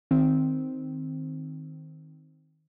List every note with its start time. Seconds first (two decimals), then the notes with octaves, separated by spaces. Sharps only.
0.11 D#3 C4